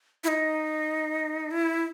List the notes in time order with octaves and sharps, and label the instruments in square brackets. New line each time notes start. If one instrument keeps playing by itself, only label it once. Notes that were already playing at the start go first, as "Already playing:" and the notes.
[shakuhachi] E4
D#4
E4